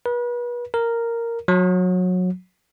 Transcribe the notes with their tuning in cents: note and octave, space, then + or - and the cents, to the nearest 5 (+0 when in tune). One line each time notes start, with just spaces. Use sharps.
B4 -35
A#4 -5
F#3 -25